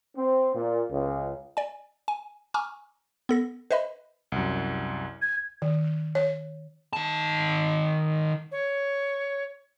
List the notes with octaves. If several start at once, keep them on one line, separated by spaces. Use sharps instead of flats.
C4
A#2
C#2
D5 G#5
G#5
G#5 A#5 C#6 D6 E6 F6
B3 A4 A#6
B4 C5 D#5 E5 B5
C2 F#2
G#6
D#3
C#5
D#3 A5
C#5